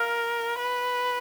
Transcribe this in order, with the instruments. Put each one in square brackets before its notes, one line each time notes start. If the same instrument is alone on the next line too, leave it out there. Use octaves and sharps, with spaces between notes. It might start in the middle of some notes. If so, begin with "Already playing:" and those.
Already playing: [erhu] A#4 [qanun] F5
[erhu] B4